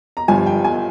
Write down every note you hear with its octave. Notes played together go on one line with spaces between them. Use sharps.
A#5
G1 G2 F3 G#5
G5
G#5